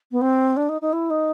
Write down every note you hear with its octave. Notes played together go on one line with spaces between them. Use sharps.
B3
C4
D4
D#4
D#4
E4
D#4